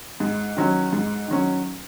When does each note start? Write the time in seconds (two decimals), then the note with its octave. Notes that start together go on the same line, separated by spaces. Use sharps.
0.20 G#2
0.57 D#3 F#3 C#4
0.93 G#2
1.28 D#3 F#3 C#4